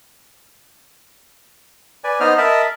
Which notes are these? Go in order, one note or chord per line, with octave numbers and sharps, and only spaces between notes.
B4 D5 G#5
B3 D#4 C5 D#5 F6
A#4 D#5 E5 A5 B5